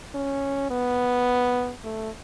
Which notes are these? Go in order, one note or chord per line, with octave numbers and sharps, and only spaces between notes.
C#4
B3
A3